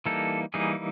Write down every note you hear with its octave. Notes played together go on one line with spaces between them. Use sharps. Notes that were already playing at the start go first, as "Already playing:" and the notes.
E3 G3 A#3 D#4 A4
E3 G3 A#3 D#4 G#4